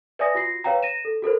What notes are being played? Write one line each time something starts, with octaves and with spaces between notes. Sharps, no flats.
B4 D5 E5 G#5 D#6 A#6
F4 F#4 A#6 C7
B4 C#5 F5 G5 A#5
A#6 D#7 E7
A4
F#4 A4 A#4 C5